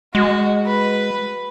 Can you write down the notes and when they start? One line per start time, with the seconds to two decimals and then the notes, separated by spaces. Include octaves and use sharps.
0.15 G#3 F#4
0.66 B4